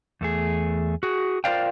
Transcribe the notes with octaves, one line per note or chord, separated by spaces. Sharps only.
E2 A3 G#4
F#4 G#4
F4 A#4 C5 D5 F5 G5